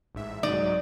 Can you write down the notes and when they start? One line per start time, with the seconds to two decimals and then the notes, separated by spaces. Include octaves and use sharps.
0.15 A1 G#2 E5
0.43 C2 G#2 F#3 D#4 D5